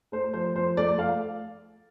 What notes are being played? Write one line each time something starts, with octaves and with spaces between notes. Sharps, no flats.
A3 C5
F3 C5
F3 C5
A3 D5
A3 F5